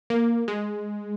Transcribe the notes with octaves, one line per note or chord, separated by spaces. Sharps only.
A#3
G#3